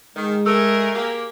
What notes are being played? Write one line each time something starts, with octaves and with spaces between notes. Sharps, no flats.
D#3 G#3
A3 G#4 A#4 E6
A#3 G4